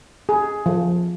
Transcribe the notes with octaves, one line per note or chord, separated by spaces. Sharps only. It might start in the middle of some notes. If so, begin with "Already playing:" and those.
G#4
F3